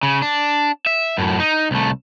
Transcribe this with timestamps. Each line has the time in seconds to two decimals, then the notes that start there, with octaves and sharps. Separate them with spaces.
0.03 C#3
0.22 D4
0.86 E5
1.18 F#2 A2
1.40 D#4
1.71 C2 A3